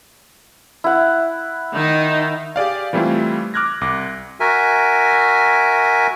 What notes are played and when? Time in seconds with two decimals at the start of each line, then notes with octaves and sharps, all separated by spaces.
0.84 E4 F#5
1.74 D#3 D#4
2.56 G4 G#4 D5 F5
2.93 E3 G3 A3 C4 E4 F4
3.54 D6 F6 F#6 G#6 A#6
3.81 C2 D6 A#6
4.40 F#4 A#4 E5 G#5